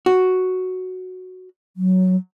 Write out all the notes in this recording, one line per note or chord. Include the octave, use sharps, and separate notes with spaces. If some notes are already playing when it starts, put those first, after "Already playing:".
F#4
F#3